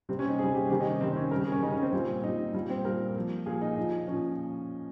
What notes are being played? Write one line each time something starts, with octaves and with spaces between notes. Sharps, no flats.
C3 G3 C4
C#4
D#4
C3 G3 G#4
G4
C3 D#3 G3 G4
D#4
C#4
C3 D#3 G3 C4
D#4
C#4
C#3 G3 A#4
G#4
C#4
C#3 G3 D#4
C#4
C4
A#2 G3
A#2 G3 D#4
A#2 G3
C4
A#2 G3 A#4
A#2 F3
A#2 F3 G#4
D#4
A#2 F3
A#2 F3 C#4